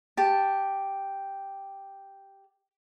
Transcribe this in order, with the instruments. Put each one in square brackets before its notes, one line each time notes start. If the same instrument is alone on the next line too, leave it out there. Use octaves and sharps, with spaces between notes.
[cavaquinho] G4 A5